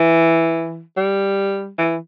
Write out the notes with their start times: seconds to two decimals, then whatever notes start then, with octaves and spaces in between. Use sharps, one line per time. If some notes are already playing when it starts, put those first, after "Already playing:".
Already playing: E3
0.97 G3
1.78 E3